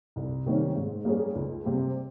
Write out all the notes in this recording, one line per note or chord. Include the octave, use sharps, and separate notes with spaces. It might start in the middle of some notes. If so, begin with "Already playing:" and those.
C2
C3 D#3 G3 C#4
G#2
G3 A#3 C#4 G#4
C#2
C3 G3 C4 G4